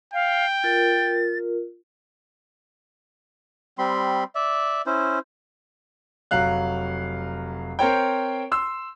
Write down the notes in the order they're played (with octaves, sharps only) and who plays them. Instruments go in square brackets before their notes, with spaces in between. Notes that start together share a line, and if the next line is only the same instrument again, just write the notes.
[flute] F5 [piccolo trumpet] G5
[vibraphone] F4 A#4 [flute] A6
[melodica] G3 C4 B5 C6
D5 E5
C#4 E4 C5
[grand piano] F1 F#3 F5 F#6
C4 A#4 C5 C#5 G5
C6 E6